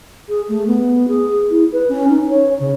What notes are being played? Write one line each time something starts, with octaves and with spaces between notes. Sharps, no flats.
G#4
A3
B3
G#4
E4
B4
C#4
D#4
C#5
C#3